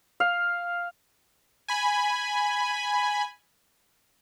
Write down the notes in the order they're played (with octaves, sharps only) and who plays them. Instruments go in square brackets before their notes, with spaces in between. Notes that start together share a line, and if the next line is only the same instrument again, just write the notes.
[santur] F5
[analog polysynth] G#5 B5